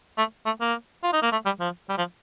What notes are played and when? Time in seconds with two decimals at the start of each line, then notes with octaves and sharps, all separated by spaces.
0.18 A3
0.46 A3
0.61 A#3
1.03 F4
1.13 D#4
1.22 A#3
1.32 A3
1.45 G3
1.60 F3
1.89 G3
1.98 F3